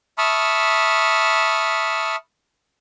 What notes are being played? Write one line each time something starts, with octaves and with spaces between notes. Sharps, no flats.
E5 A5 B5 C#6 D#6 F6